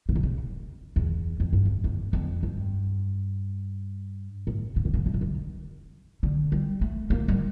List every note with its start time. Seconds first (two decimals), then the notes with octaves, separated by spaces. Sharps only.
0.09 C#3
0.15 A#2
0.23 C#3
0.96 E2
1.40 F2
1.53 G2
1.65 F2
1.84 E2
2.13 F2
2.43 G2
4.47 A2
4.76 C#3
4.85 D3
4.94 C#3
5.06 D3
5.14 C#3
5.21 D3
6.23 D3
6.52 G3
6.81 A3
7.10 A#3
7.28 G3